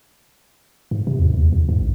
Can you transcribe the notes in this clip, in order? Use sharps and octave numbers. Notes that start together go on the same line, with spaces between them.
G#2
C3
E2
D#2
E2
G#2
A#1